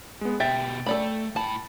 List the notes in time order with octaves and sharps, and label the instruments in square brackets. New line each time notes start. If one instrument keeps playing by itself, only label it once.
[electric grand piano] G#3 B3
[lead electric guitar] B2 G4 [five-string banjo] E5 [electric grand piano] G5 A6
[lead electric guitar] A3 [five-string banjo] A4 D5 B5
[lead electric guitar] A2 B5 [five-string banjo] A5